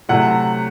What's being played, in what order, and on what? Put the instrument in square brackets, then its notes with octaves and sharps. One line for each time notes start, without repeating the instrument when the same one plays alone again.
[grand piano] C3 F#3 A3 E4 F#5